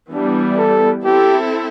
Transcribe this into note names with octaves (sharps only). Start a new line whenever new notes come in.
E3 G3 B3 D4
A4
C4 E4 G4 A4